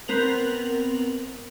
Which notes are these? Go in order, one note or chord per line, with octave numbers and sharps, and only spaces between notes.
B3 C4 A#4 F7 F#7